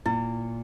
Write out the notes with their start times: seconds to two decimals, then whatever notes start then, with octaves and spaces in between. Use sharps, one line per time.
0.05 A#2 E4